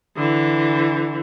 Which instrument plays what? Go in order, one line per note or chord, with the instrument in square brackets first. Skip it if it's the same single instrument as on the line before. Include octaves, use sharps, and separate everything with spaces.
[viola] D3 E3